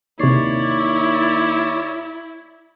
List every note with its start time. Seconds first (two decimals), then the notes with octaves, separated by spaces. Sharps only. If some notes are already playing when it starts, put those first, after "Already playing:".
0.19 D#2 C3 E4 C#5 D5 C7